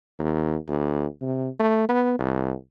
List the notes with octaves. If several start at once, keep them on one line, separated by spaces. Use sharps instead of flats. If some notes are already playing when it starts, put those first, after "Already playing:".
D#2
D2
C3
A3
B3
C2